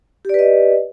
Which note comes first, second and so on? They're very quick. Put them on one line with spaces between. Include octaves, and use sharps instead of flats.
G4 D5 B4 D#5